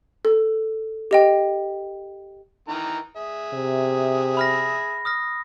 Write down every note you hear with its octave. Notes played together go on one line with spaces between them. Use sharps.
A4
G4 D#5 G5
D#3 E3 A#5
G#4 E5
C3
B5 F6 A#6
D#6 F6 A#6